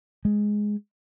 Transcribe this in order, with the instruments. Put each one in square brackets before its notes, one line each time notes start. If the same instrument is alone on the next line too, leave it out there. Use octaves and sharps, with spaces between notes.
[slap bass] G#3